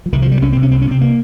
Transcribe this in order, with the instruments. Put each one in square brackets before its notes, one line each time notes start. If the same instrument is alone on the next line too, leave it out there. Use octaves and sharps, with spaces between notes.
[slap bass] F3
C2 D#3
F3
C3 G3
C2 C#4
C4
C3
C#4
C2 C4
C#4
C3 C4
A#3